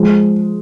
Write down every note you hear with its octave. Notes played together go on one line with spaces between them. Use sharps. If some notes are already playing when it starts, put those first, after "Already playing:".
Already playing: F3 G#3